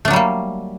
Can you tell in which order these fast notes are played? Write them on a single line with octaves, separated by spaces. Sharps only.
A3 D4 F#3 G3 A#3